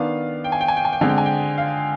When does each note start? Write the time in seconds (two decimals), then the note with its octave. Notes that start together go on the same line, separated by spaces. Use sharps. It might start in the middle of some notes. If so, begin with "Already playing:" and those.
Already playing: D#3 B3 D4 F5
0.44 G5
0.52 G#5
0.61 G5
0.68 G#5
0.77 G5
0.85 G#5
0.93 G5
1.01 D3 G#3 C4 G#5
1.09 G5
1.18 G#5
1.26 G5
1.58 F5